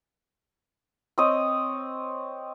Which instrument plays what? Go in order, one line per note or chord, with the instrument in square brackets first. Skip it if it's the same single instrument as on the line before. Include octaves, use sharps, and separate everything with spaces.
[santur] C4 C#5 D#5 D#6